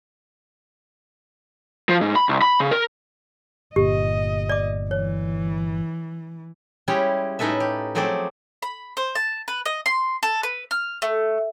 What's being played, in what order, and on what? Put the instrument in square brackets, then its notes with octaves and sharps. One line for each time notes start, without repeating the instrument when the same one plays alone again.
[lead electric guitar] F3
G#2
B5
C2
B5
C#3
A#4
[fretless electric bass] G1 A#2 [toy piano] G4 [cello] D#5
[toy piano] D5 D6
[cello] E3 [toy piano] C#5
[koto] G3 G#3 C#4 E4 G4
A2 C#4 D#4 A4 B4 E5
G4
F3 F#3 A3 C4 G#4 D5
[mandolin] B5
C5
A5
B4
D#5
C6
A4
B4
F6
A3